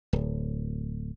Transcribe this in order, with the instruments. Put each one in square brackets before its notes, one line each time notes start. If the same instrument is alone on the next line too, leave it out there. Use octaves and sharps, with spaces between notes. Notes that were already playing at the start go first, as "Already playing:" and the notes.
[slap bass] D1